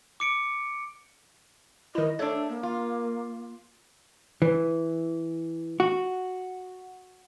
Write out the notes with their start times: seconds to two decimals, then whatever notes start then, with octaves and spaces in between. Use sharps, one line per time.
0.20 D6 C#7 D7
1.95 D#3 E4 D#5
2.19 A3 D4 A4 C#5
2.48 A#3
2.63 F4
4.42 E3
5.80 F#4